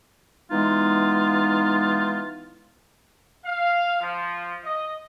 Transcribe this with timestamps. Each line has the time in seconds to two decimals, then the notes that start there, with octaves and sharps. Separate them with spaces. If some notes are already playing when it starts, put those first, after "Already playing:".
0.51 E3 G#3 B3 D#4 F4
3.45 F5
4.00 F3
4.64 D#5